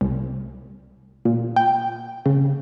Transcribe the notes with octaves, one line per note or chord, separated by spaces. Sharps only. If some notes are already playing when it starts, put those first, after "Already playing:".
C2
A#2
G5
C#3